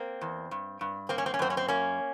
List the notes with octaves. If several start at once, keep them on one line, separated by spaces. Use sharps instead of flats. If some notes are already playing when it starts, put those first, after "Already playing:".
Already playing: A#3 C4
E2
G2
G2
A#3 C4
C#4
C4
C#4
F#2 C4
C#4
C4
A#3 C#4